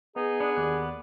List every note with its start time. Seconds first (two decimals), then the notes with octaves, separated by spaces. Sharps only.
0.16 B3 D#4 G#4
0.40 B3 D4
0.56 D#2 D5 F#6